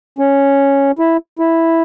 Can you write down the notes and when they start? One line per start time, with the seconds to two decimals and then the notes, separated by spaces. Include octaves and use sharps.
0.19 C#4
0.99 E4
1.39 E4